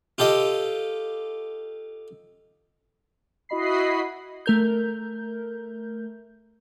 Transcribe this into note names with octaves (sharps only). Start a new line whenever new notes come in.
F4 G4 A4 D#5
E4 F#4 D#5 B5 C7
A3 A#4 G6